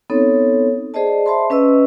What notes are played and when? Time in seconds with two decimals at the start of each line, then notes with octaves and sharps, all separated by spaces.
0.10 B3 C4 D#4 A4 C#5
0.94 G#4 C5 D5 D#5 A5
1.26 C5 E5 A5 B5 C6
1.50 C#4 B4 D#5 E6